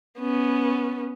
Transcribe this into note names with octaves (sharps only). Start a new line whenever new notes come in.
B3 C#4